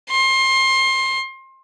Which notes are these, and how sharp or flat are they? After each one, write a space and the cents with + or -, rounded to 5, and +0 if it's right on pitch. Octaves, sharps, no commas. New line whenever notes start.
C6 +25